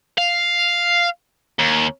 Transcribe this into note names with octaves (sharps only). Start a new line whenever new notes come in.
F5
D#2